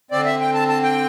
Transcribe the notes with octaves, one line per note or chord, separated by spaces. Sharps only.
D3 C4 D5
E5
G5
A5
A5
G5